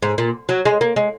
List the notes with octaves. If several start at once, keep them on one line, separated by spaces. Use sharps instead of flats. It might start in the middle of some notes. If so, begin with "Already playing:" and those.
G#2
A#2
F#3
G#3
A#3
G#3